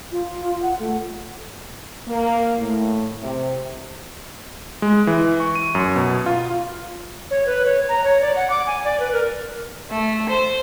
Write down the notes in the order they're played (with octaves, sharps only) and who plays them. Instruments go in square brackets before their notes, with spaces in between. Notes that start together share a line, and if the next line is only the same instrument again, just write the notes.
[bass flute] F4
F#5
A3
[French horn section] A#3
A2
C3
[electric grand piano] G#3
E3
C#6
D#7
F#2
B2
F4
[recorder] C#5
B4
C#5
A#5
C#5
D5
F#5
D6
G#5
D5
B4
A#4
[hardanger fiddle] A3
C5